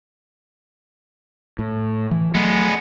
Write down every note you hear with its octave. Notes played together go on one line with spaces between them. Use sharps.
A2
E3
F#3 G#3 A3 B3